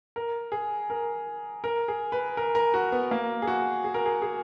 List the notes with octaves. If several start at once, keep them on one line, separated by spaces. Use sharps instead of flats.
A#4
G#4
A#4
A#4
G#4
B4
A#4
A#4
F#4
B3
A#3
G#4
F#4
G#4
A#4
G#4
G#4